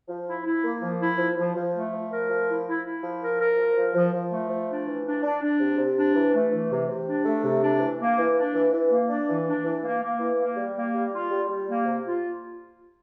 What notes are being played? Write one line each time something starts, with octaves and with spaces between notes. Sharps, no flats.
F3
E4
E4
A#3
F3
E4
F3
F3
F3
A3
F3
A#4
F3
E4
E4
E4
F3
A#4
A#4
F3
F3
F3
F3
A3
F3
D4
E3
D4
D4
D4
C3
C3
D4
E3
A3
E3
C3
C3
D4
A3
C3
D4
E3
A#3
E3
D4
E3
E3
A#3
D4
E3
D4
E3
A#3
A#3
E3
A#3
G3
A#3
G3
F4
G3
G3
A#3
C3
F4